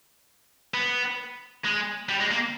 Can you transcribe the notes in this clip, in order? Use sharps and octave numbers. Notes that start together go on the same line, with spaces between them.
B3
G#3
G3
G#3
A#3